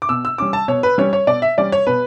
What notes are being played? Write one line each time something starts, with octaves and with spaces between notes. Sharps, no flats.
D6
B2 E6
E6
G3 C#4 D6
A5
B2 C#5
B4
G3 C#4 C#5
C#5
B2 D5
E5
G3 C#4 D5
C#5
B2 B4